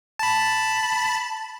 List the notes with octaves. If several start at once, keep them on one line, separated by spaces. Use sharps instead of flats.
A5 B5